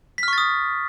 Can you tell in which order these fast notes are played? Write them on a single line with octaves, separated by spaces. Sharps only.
B6 F6 C#6 A6 D#6